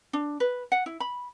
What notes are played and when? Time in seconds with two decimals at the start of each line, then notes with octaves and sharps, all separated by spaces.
0.13 D4
0.40 B4
0.72 F#5
0.86 E4
1.00 B5